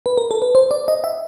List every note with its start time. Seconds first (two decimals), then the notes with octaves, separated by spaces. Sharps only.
0.06 B4
0.18 A#4
0.31 A4
0.42 B4
0.55 C5
0.71 D5
0.88 D#5
1.04 E5